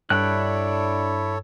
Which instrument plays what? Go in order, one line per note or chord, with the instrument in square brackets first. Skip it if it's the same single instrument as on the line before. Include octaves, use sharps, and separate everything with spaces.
[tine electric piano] G2 [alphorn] D4 [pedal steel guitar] E4 G5 F#6 [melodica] A4 C#5